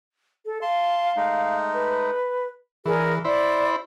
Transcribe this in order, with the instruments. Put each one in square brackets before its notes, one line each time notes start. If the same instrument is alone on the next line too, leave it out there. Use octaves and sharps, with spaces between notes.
[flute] A4
[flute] F5 [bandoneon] A5 C6
[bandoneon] G#3 A3 D#4
[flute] B4
[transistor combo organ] E3 [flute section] G#4 A#4 D5
[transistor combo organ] E4 C5 B5 [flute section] D5